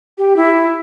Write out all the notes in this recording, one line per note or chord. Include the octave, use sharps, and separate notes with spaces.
G4
E4